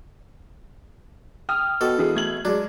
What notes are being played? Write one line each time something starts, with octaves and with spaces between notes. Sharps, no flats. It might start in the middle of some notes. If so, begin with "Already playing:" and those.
G5 D#6 F6
B2 A4
E3 F#4 G#4
A3 G#6 F#7
F#3 G#3 D4